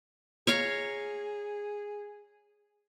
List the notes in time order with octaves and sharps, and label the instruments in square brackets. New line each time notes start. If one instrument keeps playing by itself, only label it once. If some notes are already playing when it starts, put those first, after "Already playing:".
[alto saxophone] G#4 [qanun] C#5 F5 A#5